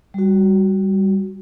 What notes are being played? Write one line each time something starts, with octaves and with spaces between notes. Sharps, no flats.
G3 F#4